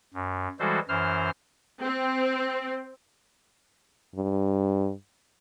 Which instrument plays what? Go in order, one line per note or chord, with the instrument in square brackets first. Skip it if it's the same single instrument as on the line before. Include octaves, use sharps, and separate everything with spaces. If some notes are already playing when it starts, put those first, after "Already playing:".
[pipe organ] F#2
E3 G3 G#3 F#4 A4 C5
F#2 E3 C5 F6
[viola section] C4
[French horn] G2